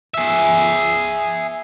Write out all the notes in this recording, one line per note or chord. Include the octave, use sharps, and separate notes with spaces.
G#4 E5